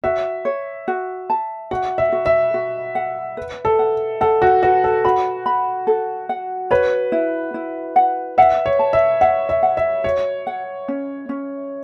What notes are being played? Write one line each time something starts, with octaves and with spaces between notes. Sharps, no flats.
F#4 E5
C#5
F#4
A5
F#4 F#5
E5
F#4
E5
F#4
F#5
B4
A4
F#5
A4 F#5
F#4
F#4 B4
A4
F#4 B5
B5
A4
F#5
B4 C#5
E4
E4
F#5
E5 F#5
C#5
A5
E5
E5 F#5
E5
F#5
E5
F#4 C#5
F#5
C#4
C#4